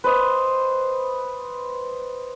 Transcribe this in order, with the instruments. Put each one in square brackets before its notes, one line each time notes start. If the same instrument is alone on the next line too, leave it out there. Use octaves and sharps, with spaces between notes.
[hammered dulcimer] B4 C5 D#5